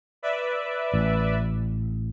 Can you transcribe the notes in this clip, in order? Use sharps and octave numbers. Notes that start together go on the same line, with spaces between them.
B4 D5 E5
A1